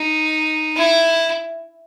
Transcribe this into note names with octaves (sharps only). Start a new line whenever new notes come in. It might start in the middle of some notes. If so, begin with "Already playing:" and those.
Already playing: D#4
E4